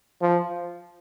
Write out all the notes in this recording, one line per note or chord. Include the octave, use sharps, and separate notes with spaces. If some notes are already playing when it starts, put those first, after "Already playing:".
F3